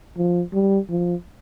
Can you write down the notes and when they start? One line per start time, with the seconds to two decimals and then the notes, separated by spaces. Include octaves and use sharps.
0.17 F3
0.53 G3
0.90 F3